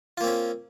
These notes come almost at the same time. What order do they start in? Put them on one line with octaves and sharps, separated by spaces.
F4 A#3 C4 C#4